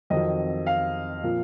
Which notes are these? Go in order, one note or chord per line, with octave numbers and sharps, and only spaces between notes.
F2 D#3 F#3 D#5
F5
A#2 F3 A#3